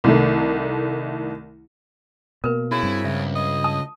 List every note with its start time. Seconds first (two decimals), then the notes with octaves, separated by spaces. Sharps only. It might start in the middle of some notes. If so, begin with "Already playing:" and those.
0.04 C2 D#3 A3
2.44 B2 A#3 A#4 B4
2.71 C#3 E4 F#4
2.83 G2 C4
3.04 C#2 E5
3.35 D#5
3.64 A5 D#6